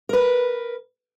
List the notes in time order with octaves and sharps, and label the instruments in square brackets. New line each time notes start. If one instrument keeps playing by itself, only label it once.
[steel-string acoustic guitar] A#4 B4